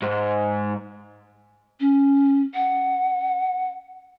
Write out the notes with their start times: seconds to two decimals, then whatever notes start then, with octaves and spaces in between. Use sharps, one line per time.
0.02 G#2
1.81 C#4
2.55 F#5